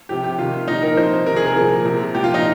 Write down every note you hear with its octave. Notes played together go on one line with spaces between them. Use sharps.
C3 F3 G4
G4
C3 D#3 F4
A#2 F3 D#4
A#4
C3 F3 C5
C3 D#3 A#4
G#4
A#4
A#2 F3
C3 F3
A#2 F3 G4
F4
D#4